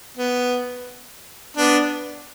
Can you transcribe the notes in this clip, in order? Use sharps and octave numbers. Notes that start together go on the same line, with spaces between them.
B3
B3 D4